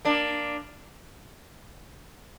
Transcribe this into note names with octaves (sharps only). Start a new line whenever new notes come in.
A#3 D4